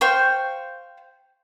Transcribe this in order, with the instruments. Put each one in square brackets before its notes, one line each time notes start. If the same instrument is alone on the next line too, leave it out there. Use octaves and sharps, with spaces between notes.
[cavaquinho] C5 F5 G5 C#6